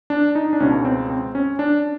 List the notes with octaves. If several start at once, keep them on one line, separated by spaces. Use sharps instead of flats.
D4
D#4
D4
C#2 B2 C#4
C4
C4
C#4
D4